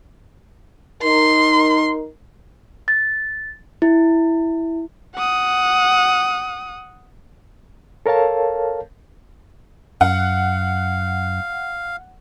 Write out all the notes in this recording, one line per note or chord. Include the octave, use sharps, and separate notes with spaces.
D#4 A#4 C6
A6
E4
F#5 D#6
A4 A#4 C#5 F5 A5
F#2 F5 F#5